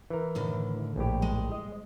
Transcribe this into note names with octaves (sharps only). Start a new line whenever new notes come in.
E3 A#4
A2 D3 D#3
A#1 A2 G4
G#3
D#5